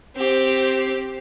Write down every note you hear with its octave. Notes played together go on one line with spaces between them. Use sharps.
C4 G4